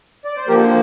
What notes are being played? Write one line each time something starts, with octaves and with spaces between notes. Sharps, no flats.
D5
C5
D3 F3 A#3 G4 A#4